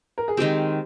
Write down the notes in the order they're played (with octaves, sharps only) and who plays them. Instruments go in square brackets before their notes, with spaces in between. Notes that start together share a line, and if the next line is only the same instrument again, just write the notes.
[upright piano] A#4
G#4
[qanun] D#3 G#3 C4 [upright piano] G4